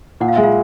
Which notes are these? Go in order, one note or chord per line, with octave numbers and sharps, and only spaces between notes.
A#2 F#5
F5
G#3 E5
F4 F5